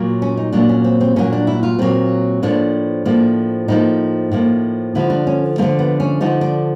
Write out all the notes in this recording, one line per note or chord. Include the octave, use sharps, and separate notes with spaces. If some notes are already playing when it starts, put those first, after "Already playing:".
Already playing: A#2 F#3 A#3
C#4
D#4
A#2 F#3 A#3 D4
C#4
C4
C4
A#2 F#3 A#3 C#4
D4
E4
F4
A#2 F#3 A#3 C4
A2 F3 A#3 D4
A2 F3 A#3
A2 F3 A#3 D#4
A2 F3 A#3
D3 F3 A3 E4
D4
C#4
D3 F3 A3 A#3
B3
C#4
D3 F3 A3 D#4
D4